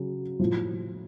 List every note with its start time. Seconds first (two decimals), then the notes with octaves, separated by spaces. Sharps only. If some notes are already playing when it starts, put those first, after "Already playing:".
Already playing: C#3 F#3
0.40 A2 F3